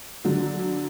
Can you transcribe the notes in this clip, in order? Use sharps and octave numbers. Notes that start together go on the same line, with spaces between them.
D3 F#3